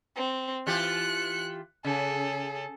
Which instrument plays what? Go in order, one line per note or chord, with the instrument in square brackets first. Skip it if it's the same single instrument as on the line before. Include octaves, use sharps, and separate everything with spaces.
[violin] C4
[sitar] E3 F4 G4 [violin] F#6 C#7
[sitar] C#3 [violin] G#4 A4